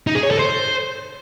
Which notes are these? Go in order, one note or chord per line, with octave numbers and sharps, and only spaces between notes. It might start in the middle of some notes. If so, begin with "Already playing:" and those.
D#4
G#4
C#5
A4
C5